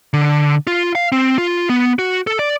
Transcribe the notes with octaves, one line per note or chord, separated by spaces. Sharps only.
D3
F4
F5
C4
F4
B3
F#4
A4
D5